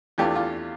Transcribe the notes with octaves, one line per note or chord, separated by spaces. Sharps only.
E2 E3 A3 D4 F4 G4
F4